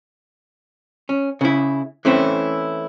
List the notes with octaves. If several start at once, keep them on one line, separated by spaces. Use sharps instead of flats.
C#4
C#3 E4
E3 A3 C4 C#4 E4